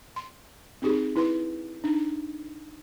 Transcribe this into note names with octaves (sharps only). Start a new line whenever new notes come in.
C6
C4 D#4 G4 G#4
E4 B4 C6
D4 D#4